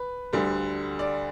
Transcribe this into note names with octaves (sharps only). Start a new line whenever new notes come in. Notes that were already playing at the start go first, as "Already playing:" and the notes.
Already playing: B4
D2 D3 G3
D5